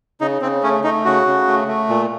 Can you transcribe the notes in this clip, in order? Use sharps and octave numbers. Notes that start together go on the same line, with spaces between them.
C#3 D#4
C#3 C4
A3 C#4
A3 D#4
C#3 F#4
C#3
A3
A3
A#2